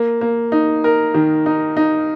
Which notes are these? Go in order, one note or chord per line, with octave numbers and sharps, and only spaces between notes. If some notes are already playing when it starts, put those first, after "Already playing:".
Already playing: A#3
A#3
D#4
A#4
D#3
D#4
D#4